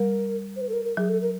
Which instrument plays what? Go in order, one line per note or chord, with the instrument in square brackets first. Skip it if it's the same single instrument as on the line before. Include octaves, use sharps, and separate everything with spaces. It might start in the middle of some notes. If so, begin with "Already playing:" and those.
Already playing: [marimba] G3 [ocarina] A#4
[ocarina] C5
B4
A4
A#4
A#4
[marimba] F#3 [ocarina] G#4
[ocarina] A4
A#4